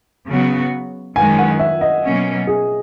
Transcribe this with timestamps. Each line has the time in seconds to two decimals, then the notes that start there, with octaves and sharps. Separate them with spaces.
0.28 C#3 F#3 B3 F#4
1.16 F#2 D#3 G#3 C#4 G#5
1.38 F#5
1.60 E5
1.81 D#5
2.04 B2 F#3 A#3 C#4
2.47 G#4